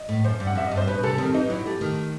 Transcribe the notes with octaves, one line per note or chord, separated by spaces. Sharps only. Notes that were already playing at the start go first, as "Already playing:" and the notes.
Already playing: D#5
A2
F#2 C5
G2
F#5
F#2 E5
G2 D#5
C5
B2 B4
C3 A4
D#3 C4
E3 D#4
F#3 E4
A3 G4
D#3